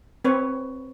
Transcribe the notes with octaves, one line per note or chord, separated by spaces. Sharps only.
C4 B4 C#5